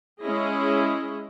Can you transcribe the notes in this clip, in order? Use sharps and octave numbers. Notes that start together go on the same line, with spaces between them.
G#3 C#4 E4 G#4 D#5